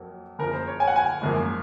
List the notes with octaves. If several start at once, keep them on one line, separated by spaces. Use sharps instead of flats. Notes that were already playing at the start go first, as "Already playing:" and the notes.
Already playing: F2 F#3 A#3
F#1 F2 C#3 F3 A#4
C5
C#5
G#5
F#5
G#5
G#1 F#2 F3 A#3